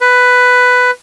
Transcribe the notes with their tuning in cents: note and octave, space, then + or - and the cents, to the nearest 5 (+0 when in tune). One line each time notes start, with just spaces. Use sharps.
B4 +10